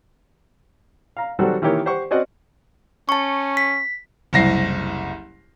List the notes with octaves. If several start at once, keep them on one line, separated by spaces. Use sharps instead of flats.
F5 A#5
D#3 F#3 G3 C4 F#4 A4
D#3 E3 A#3 G4 C#5
G4 C5 F#5 C#6
C4 C#4 F#4 D5 D#5 F#5
C#4 A5 C#6
B6
F#1 C2 A#6 C7